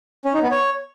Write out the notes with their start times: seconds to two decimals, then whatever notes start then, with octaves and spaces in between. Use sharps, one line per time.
0.25 C#4
0.34 D#4
0.42 B3
0.51 C#5